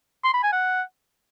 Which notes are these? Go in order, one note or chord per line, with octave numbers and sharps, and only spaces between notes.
C6
B5
G#5
F#5